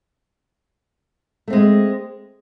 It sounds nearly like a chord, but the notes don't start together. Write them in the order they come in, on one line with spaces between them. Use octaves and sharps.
A3 C4 G#3